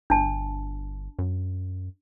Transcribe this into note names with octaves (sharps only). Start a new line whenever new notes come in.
G1 D4 A5
F#2